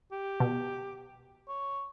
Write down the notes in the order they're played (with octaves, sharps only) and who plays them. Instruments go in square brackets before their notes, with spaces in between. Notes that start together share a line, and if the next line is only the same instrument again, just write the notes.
[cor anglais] G4
[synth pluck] B2
[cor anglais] C#5